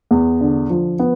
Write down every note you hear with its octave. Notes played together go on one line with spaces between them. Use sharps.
E2
D3
F3
B3